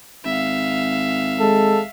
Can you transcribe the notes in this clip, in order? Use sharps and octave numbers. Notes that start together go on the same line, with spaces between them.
G#1 E5 F5
G#3 A4